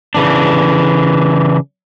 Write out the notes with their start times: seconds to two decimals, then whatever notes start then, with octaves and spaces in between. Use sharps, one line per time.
0.15 C#3 E3 D4